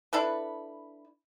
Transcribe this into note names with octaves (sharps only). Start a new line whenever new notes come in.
D4 E4 A4 B4